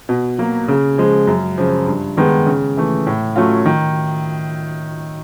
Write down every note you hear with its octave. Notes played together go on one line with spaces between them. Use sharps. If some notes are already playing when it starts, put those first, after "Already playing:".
B2
F#3 A#3
C#3
F3 G#3
F#2
C#3 F3
G2
D#3 G#3 B3
C#3
E3 A3
A2
F#3 A3 C#4 F4
D#3